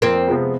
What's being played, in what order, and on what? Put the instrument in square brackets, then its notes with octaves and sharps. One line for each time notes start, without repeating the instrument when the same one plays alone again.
[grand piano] F2 [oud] A#3 C4
[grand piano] C3 F3 G#3 B3